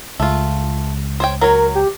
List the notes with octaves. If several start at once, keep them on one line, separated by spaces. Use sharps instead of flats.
C#2 A3 F4
C5 C#5 G5
F#3 A#4 C#5
G4